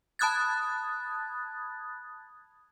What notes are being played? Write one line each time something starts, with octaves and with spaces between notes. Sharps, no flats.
A5 B5 D#6 F#6 G#6 A6